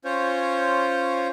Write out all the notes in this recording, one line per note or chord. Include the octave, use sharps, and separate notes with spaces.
C#4 F4 C5 C#5